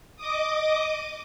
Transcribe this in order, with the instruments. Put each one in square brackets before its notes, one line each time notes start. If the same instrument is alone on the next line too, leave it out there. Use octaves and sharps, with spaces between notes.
[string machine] D#5 D6 D#6